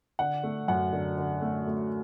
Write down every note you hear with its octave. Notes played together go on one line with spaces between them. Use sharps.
D3 F#5
A3
F#2 F#5
D3
D3
A3
A3